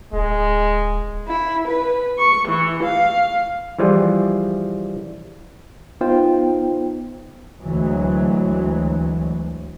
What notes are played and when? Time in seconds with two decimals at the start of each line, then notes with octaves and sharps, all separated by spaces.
0.13 D1 G#3
1.28 E4
1.68 B4
2.19 C#6
2.49 E3
2.83 F5
3.79 E3 F3 G3 F4 G#4
6.01 B3 D#4 F4 C5 G5
7.61 D2 E3 F#3 G#3